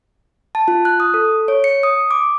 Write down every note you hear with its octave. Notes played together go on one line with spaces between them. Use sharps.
A5
F4
F#6
D#6
A4
C#5
C#7
D#6
D6